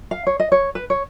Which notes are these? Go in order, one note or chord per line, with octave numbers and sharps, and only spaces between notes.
F5
C#5
D#5
C#5
B4
C#5